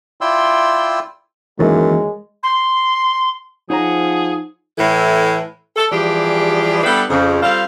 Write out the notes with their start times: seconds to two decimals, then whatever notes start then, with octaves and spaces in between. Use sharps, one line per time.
0.21 E4 F4 D5 G5 C6 E6
1.59 F#2 D#3 E3 G#3 A#3
2.43 C6
3.70 F3 D#4 G#4 C#5 F#5 A#5
4.77 A2 E3 A4
5.76 A4
5.92 E3 F3 G3 G4 G#4 D5
6.84 G3 B3 D4 E4 A4 B4
7.09 F2 C#3
7.43 G3 C4 F4 A4 F5